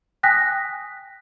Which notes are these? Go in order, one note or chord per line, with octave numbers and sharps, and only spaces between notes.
G5 G#5 D#6 F#6 A#6 B6